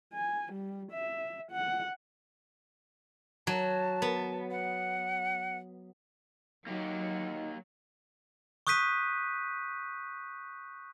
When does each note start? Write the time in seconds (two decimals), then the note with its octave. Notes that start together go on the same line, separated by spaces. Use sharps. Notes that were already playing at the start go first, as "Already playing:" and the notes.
0.14 G#5
0.53 G3
0.92 E5
1.52 F#5
3.47 F#3 A5
4.02 B3
4.51 F#5
6.67 F#3 A#3 D#4 G4
8.67 C#6 D#6 F#6 G6 B6 D#7